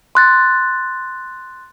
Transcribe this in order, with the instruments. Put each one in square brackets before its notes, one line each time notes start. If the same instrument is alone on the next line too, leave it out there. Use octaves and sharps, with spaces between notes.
[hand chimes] C6 F#6 A6